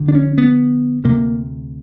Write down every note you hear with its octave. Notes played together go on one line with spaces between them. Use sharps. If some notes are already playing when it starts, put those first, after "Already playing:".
Already playing: F1 F2 D3
D4
C#4
B3
D2 C3 A#3